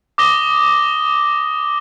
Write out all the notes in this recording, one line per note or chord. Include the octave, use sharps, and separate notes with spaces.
D6 D#6 A#6 G7